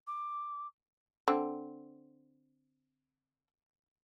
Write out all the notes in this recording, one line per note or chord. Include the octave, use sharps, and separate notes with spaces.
D6
D3 C4